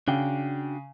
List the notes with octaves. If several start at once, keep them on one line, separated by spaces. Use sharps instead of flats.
C#3 D4 F#4 G5